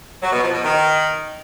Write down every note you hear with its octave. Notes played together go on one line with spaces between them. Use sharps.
F#3
B2
F3
B2
D#3